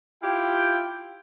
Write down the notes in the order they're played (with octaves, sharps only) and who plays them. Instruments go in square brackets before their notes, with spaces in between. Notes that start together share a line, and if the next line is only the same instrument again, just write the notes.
[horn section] E4 F4 G4 F5 G5